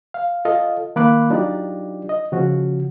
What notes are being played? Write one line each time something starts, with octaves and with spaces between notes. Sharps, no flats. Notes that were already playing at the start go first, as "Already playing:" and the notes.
F5
F4 A4 D#5 F5
D#3 A#3 F5 B5 D6 F#6
F#3 D4 D#4 F4 G4 D5
D#5
C#3 F3 C#4 F#4